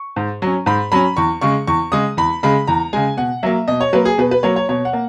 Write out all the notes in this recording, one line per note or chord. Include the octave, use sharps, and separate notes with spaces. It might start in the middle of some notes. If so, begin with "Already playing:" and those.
Already playing: C#6
G#2
F#3 C#4
G#2 B5
F#3 C#4 B5
E2 C#6
C#3 G#3 C#6
E2 C#6
C#3 G#3 D#6
E2 B5
C#3 G#3 B5
E2 A#5
C#3 G#3 G#5
B2 F#5
F#3 A#3 E5
B2 D#5
C#5
F#3 A#3 B4
G#4
B2 B4
B4
F#3 A#3 C#5
C#5
B2 C#5
F#5
A#3